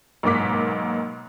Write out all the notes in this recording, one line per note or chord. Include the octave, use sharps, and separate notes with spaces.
B1 G#2 A#3 D6 B6